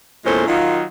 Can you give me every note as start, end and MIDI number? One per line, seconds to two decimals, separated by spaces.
0.25 0.46 40
0.25 0.46 46
0.25 0.46 56
0.25 0.46 61
0.25 0.46 69
0.25 0.46 72
0.47 0.84 51
0.47 0.84 54
0.47 0.84 63
0.47 0.84 65